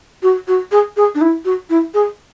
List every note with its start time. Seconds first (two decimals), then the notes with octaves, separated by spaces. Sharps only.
0.22 F#4
0.47 F#4
0.71 G#4
0.96 G#4
1.14 D4
1.21 E4
1.45 F#4
1.69 E4
1.94 G#4